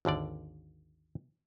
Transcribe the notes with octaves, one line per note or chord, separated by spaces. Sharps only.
G#1 D#2 D3 D5